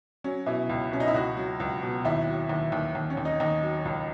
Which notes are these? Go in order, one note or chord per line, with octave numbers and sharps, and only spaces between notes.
F#3 C#4
B2 E4
C#2
B2 C#4
D#4
E4
C#2 F#4
F#3
C#2
B2
D#2 E4
F#3
D#2
D#2
D#2
C#4
D#2
D#4
D#2 D#4
F#3
C#2